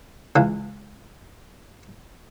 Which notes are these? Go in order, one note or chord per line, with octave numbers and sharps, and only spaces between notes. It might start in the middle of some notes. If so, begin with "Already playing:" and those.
C#2 E3 F5